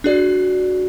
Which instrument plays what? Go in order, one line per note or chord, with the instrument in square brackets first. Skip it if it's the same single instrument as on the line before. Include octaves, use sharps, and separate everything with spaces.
[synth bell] D4 G#4 D5 [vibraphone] F#4